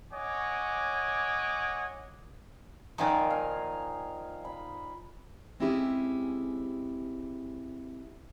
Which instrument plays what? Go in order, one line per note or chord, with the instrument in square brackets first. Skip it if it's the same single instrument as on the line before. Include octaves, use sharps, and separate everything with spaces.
[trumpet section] C#5 D#5 F#5 G#5 D6
[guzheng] A#2 D#3 F3 [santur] D#4 F5 G#5
[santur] F5
B5
[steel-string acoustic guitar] G#3 C4 C#4 E4 G4 G#4